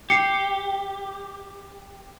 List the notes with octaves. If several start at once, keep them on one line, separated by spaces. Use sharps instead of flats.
G4 C7 C#7